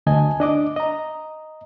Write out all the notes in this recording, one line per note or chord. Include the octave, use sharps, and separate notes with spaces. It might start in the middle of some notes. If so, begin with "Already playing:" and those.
D2 D3 D#5 G#5 A5
D4 D#5 D6
D#5 A#5